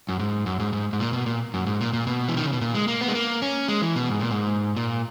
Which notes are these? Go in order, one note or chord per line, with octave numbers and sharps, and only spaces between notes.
F#2
G#2
F#2
G#2
G#2
G#2
A#2
B2
A#2
F#2
G#2
A#2
A#2
B2
E3
D#3
C#3
B2
A#2
G#3
A#3
B3
G#3
A#3
C#4
G#3
E3
B2
G#2
A#2
G#2
A#2